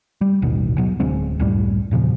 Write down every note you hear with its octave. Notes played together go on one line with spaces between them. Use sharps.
G3
A1 D#2 B2 D#3
B2 F#3
D1 D3 G#3 C4
C#2 F#2 A2 G3
E2 A#2 C#3 F3